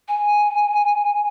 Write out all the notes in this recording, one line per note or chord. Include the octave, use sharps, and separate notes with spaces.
G#5